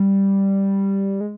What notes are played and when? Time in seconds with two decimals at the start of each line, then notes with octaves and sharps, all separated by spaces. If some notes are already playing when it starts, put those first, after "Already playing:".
Already playing: G3
1.21 G#3